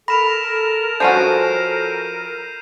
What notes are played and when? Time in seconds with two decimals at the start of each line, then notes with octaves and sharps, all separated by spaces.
0.08 A4 A#4 B5 A#6 E7 F7
1.00 F3 C#4 F#4 G6 C7 D#7